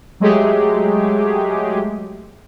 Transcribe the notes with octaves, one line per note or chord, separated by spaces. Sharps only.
F#3 G#3 A3 G4 G#4